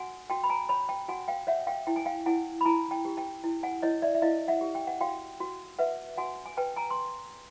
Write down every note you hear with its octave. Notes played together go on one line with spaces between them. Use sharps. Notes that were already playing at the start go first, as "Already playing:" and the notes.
Already playing: F#4 F#5 G#5
F#4 G5 A5
B5
G#5 A#5
C#5 A5 B5
G5 A5
F#4 F#5 G#5
F5 G5
C#5 E5 F#5
F5 G5
E4 G5
G#5
F5 G5
E4 F#5 G#5
B5
E4 G#5 A#5
G5 A5
G4
G5 A5
E4
F#5 G#5
E4 C#5 D#5
D5 E5
E5
E4 D#5 F5
E5 F#5
G4
G5
F#5
F#4 F5 G5
F#4
B4 E5 F#5
F#4 F#5 G#5
G#5
B4 G5 A5
G#5 A#5
C6